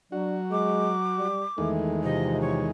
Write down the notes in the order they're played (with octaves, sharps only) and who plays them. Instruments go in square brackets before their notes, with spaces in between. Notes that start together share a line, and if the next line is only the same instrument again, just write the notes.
[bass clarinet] F#3 [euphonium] D4 [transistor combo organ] F#4
[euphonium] G#3 [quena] D6
[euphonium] G3
[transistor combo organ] E2 D#3 G#3 [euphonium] A3
[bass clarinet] C3 [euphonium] F3 [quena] D#5
[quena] C#5